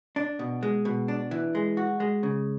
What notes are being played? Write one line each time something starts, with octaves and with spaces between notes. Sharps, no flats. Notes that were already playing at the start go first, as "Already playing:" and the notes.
D4
B2
G#3
B2
D4
E3
G#3
F#4
G#3
C#3